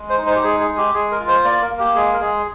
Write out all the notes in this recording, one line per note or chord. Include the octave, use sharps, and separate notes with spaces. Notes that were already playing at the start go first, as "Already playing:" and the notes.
Already playing: G#3
C5
D#4
C5
G4
G#3 G#4
G#4
G#3
G4
G#3 G#4
A#4
F4
C5
A#3 D5
A#4
A#3
G4
G#3 G#4
A#4
G#3 G#4